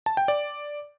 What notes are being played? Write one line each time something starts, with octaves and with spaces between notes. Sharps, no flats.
A5
G5
D5